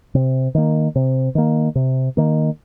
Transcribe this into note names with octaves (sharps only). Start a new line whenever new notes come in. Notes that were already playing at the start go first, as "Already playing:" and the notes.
C3
D#3 A#3
C3
D#3 A#3
C3
D#3 A#3